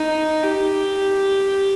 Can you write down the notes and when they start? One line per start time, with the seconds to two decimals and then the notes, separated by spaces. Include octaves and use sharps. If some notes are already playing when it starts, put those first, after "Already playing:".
Already playing: D#4
0.43 G4